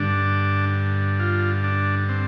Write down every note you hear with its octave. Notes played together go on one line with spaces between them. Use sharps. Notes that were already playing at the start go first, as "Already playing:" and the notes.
Already playing: G2 D3 D4
F4
D4
C4